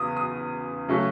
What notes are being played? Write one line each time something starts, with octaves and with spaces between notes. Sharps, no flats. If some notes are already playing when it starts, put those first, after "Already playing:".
Already playing: E2 C#3 B3 D#6
D#6
C#3 F#3 A3 C#4